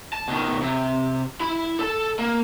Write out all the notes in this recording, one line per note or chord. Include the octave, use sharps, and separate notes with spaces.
A5
B2 D#3
C3
E4 B5
A4 A5
A#3